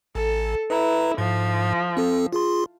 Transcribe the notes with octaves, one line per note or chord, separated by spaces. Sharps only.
A1 A4
E4 B4 A#5
G#2 F3
C4 A4
F4 G#4 C6